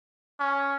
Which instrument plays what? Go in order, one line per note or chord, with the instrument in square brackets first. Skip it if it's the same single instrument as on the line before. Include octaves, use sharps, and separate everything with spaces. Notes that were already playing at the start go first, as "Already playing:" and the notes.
[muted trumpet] C#4